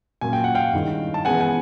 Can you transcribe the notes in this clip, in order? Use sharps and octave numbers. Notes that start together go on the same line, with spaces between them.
A#2 F#3 A#3 C#4 G#5
G5
F#5
F5 G5
G2 D#3 G#3 C#4 E4
A5
C#3 E3 G#3 B3 F#5 G#5
G#5